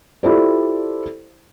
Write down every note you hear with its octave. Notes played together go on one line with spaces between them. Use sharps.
E4 F4 G4 A4 C5 D5